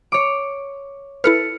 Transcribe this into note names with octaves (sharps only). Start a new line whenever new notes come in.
C#5 D6
E4 A4 B4 F6 C#7